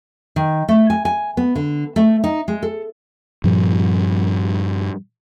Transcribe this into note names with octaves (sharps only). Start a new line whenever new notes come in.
D#3
A3
G#5
G#5
B3
D3
A3
D#4
G#3
A4
G2 A#2 F3 G3